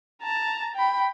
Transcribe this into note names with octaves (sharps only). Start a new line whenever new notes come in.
A5 A#5
G5 B5